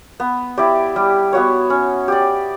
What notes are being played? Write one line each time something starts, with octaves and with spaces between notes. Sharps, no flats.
B3
E4 G4 D5
G3
B3 F#4 C#5
C#4
G4 D5